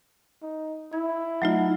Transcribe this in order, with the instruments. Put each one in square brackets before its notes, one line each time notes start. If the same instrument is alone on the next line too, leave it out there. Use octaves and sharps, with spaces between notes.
[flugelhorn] D#4
[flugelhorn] E4 [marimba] G#6
[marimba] F#3 A3 F4 [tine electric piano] D#4 F#5